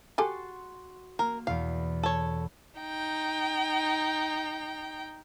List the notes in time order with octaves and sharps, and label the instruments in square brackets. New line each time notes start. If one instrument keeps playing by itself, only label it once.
[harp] F#4 C6 A6 [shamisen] G4 A4 G#5
[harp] A#3 [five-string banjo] A#4
[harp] E2 B2 [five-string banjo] F5
[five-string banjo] A4 C#5
[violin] D#4 G5